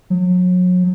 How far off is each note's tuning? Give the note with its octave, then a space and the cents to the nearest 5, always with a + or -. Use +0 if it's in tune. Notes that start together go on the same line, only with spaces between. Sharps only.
F#3 -35